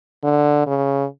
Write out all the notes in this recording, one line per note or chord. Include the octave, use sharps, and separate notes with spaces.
D3
C#3